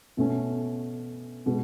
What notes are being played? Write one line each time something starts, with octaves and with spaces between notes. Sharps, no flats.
B2 A3 C#4
B2 G#3